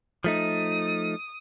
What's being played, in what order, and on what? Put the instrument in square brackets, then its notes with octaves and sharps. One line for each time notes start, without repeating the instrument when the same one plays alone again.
[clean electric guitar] F3 A3 D#4 [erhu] D#6